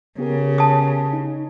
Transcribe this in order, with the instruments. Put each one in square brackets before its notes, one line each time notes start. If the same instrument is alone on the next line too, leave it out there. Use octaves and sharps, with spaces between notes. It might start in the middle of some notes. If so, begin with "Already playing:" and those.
[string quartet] C#3 [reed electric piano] B3 G4 A#4
[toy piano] A5 D#6
[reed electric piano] D#4